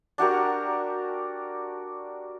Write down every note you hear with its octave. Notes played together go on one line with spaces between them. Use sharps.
D4 F#4 G4 A#4